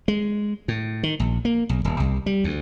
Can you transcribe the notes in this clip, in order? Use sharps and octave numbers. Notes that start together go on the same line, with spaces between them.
G#3
A2
D#3
A#1
A#3
B1
D#1
C2
G3
D2